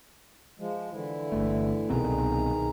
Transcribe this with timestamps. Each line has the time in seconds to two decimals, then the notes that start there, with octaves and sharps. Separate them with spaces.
0.60 F3 G#3
0.93 D3 E3 E4
1.32 G1 A3
1.90 C2 B2 D#3 C4 G#4 A#5